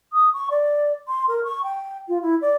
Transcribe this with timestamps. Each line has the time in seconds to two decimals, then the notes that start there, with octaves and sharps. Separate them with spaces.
0.13 D#6
0.33 C#6
0.51 D5
1.08 C6
1.28 A#4
1.44 C#6
1.64 G5
2.08 F4
2.22 E4
2.41 D5